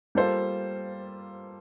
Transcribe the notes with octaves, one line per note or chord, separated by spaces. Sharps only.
G3 A#3 F4 A4 C5